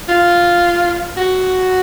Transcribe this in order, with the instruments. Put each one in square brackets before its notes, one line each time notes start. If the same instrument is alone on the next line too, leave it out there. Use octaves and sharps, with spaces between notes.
[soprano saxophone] F4
F#4